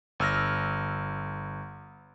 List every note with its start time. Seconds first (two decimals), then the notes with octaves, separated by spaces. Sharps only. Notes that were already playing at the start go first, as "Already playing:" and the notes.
0.20 G1 E6 F6 A#6